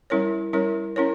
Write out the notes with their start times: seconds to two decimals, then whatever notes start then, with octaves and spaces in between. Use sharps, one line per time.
0.10 G3 C#4 E4 A#4 C#5
0.53 G3 C#4 E4 A#4 C#5
0.96 C#4 E4 A#4 C#5